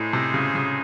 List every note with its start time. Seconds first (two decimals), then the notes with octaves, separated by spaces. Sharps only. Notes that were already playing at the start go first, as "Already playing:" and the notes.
Already playing: A2 G#3 D#4 G#4 C5
0.13 C3
0.34 C#3
0.55 C#3